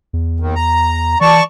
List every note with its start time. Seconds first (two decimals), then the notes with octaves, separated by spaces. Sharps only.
0.13 E2
0.40 D#2 D#3
0.55 A#5
1.21 E3 D5 A5 C#6